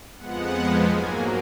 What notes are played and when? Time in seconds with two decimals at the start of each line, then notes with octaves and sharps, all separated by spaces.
0.17 F2 F3 G#3 B3 F#5
0.87 G#2 F#3 A#3 G#5